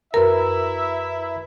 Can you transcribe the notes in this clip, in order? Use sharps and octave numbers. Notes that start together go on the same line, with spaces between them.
F#2 E4 A#4 B4 E5 A#5